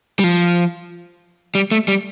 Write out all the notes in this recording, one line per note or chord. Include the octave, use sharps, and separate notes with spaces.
G3
F3
G3
A3
G3